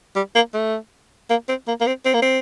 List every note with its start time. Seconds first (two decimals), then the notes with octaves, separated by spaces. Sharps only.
0.16 G3
0.35 A#3
0.54 A3
1.30 A#3
1.49 C4
1.67 A#3
1.80 A#3
1.87 C4
2.05 C4
2.14 A#3
2.22 C4